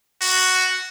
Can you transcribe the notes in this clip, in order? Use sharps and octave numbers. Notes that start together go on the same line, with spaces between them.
F#4